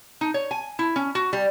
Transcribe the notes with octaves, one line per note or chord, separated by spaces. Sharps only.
D#4
C#5
G#5
E4
C#4
F#4
G3